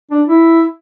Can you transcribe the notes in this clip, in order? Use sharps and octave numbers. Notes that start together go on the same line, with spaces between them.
D4
E4